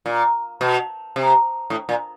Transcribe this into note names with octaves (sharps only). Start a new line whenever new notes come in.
A#2
B2
C3
A2
A#2